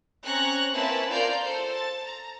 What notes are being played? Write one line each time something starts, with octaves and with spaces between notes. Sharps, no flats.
C4 C#4 A#5 C#6 F#6
A#3 C4 C#4 E4 B4 A5
F4 A#4 D5 F5 A#5 G6
A4 C5
A5 A6
A#5